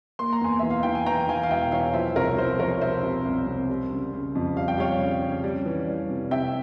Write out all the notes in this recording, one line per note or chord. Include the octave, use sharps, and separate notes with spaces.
A#3 C6
A#5
E2 G#5 C6
E3 E5
F5
E3 G5
G#5
E3 G5 A#5
E3 F5 G#5
F5
E1 E5 G5
E3 C#5 F5
F3 C5 E5
C2 A#4 C#5
F3 C5
F3 A#4 C#5
C3 C5 E5
C3
C2
C3
G3
C#3
C#3
F2
G3 F5
G5
G3 C#5 F5
C#3
C#4
G3
E3
G3
C3
C3 E5 G5